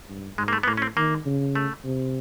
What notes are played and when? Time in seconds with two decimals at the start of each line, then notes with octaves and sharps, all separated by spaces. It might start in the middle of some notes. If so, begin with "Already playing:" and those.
0.09 G2
0.38 G#2 G#3
0.48 A#3
0.53 A3
0.63 B3
0.67 A2 A#3
0.77 C#4
0.82 C4
0.97 D#3 A#3
1.26 C#3
1.55 A3
1.85 C3